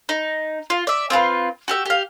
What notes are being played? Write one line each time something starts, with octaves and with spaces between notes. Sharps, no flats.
D#4
F4
D5 E5
C4 F4 A4 B4
F#4 G4 E5
G4 F5